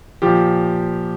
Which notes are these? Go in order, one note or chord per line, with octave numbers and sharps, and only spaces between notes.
A#2 F3 G4